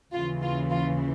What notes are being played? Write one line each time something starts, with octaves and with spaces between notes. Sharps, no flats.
D#2 C#3 E3 F4
F4
F4